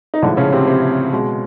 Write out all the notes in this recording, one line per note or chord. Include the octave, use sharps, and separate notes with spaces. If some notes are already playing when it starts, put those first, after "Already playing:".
D#4
A2 D3 F3 G#3 D4
C#3 C#4
C3 C4
C3 C4
B2 G#3